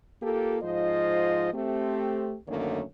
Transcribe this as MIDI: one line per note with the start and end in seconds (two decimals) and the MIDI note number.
0.22 0.58 58
0.22 0.58 65
0.22 0.58 67
0.22 0.58 69
0.62 1.52 44
0.62 1.52 53
0.62 1.52 65
0.62 1.52 72
0.62 1.52 75
1.53 2.36 57
1.53 2.36 60
1.53 2.36 67
2.48 2.82 42
2.48 2.82 50
2.48 2.82 51
2.48 2.82 57
2.48 2.82 58
2.48 2.82 73